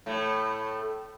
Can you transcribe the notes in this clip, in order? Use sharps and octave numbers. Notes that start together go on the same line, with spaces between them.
A2 A3